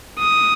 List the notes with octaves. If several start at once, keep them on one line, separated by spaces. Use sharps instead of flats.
D#6